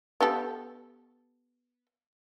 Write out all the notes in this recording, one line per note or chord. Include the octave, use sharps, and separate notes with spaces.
B3 G4 A4